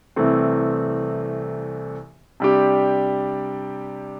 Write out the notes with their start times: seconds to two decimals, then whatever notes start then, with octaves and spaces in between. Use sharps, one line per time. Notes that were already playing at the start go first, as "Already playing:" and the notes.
0.16 C2 C3 E3 A3 C4
2.40 C3 G3 D4 G4